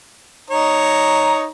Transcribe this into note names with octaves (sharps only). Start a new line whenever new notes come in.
D#4 C#5 A#5